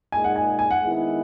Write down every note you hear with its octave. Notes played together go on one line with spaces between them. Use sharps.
A#2 G#3 D#4 G#4 G#5
F#5
G#5
G#5
F#5
D#3 G#3 B3 E4